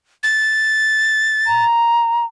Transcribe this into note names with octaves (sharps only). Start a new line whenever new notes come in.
A6
A#5